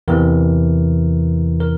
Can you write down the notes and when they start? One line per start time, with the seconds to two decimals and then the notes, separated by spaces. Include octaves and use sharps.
0.08 E2 C3 E3 A#4
1.60 A#4